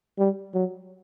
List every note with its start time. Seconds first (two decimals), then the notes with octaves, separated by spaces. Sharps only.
0.19 G3
0.54 F#3